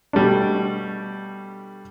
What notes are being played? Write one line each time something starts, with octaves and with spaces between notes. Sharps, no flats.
B2 G3 A3 D4